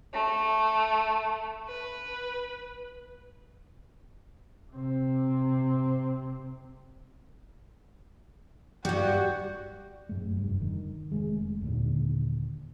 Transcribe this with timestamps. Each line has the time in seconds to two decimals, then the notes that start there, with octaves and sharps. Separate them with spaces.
0.13 A3
1.68 B4
4.73 C3 C4
8.85 G2 G3 F#4 G5
10.09 F#2 A3
10.35 F1 G2
10.61 D#3
11.11 F1 G#3 A3
11.61 D#2 A#2 D3